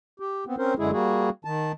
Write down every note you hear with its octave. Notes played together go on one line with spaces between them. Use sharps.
G4
B3 C4
C4 C#4 A#4 C5
F#2 D3 G#3 E4 G#4
G3 A#3 F#4 G#4
D#3 A5